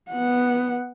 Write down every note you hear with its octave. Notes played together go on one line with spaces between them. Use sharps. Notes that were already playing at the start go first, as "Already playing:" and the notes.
B3 F#5